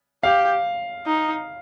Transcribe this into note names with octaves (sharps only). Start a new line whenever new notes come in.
G4 F5
D#4